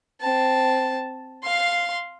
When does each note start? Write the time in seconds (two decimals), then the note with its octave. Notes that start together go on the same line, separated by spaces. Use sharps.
0.21 C4 A5
1.44 F5 C6